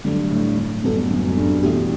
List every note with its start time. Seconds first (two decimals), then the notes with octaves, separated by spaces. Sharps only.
0.04 G2 D3 F#3 A3
0.31 A2
0.57 G2
0.84 F#2 G3 B3 F#4 A4
1.10 F#2
1.30 F#2
1.37 G2
1.63 B2 E3 A3 E4 G4